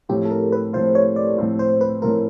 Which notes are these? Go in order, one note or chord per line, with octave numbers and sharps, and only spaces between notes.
A2 F3 A3 C4 F4 G4
A4
A#4
B4
A2 F3 A3 C4 F4 C5
C#5
D5
A2 F3 A3 C4 F4
C5
B4
A2 F3 A3 C4 F4 A#4